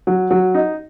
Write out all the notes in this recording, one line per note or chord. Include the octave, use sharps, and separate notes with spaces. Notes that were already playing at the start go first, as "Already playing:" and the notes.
F#3
F#3
D#4